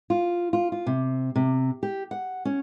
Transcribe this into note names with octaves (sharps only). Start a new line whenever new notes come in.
F4
F4
F4
C3
C3
G4
F#5
C#4